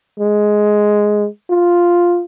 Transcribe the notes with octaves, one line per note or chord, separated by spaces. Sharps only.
G#3
F4